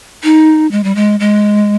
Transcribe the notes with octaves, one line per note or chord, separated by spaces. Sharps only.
D#4
G#3
G3
G#3
G#3